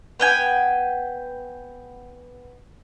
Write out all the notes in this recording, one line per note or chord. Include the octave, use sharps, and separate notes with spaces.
B3 G5 G#5